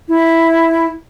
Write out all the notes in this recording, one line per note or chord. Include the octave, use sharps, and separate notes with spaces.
E4